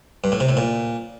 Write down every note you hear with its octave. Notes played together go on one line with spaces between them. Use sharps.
G2
A2
C3
A2
A#2